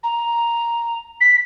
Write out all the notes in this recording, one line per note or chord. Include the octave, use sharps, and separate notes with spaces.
A#5
B6